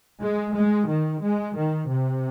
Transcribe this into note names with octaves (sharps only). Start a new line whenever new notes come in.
G#3
G#3
D#3
G#3
D#3
C3